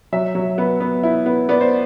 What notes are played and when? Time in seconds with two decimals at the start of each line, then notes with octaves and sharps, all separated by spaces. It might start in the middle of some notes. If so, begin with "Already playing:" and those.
0.12 F#3 E5
0.35 F#3
0.58 B3
0.80 B3
1.03 E4
1.26 B3
1.49 B3 D5
1.61 C5